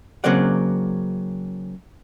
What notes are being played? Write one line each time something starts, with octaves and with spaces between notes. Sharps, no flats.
C#3 F#3 A#3 C4 D5 F#5